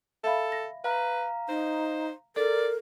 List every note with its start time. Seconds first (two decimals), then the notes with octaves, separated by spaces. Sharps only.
0.24 A4 E5 F5 B5
0.52 A#6
0.84 B4 F5 A#5
1.48 D#4 C5
2.36 A4 A#4 D5